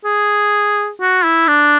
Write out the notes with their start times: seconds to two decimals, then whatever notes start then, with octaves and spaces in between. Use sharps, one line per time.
0.04 G#4
1.01 F#4
1.24 E4
1.48 D4